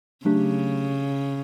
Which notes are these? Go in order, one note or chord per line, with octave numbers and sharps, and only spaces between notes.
C#3 F#3 A3 D4 G4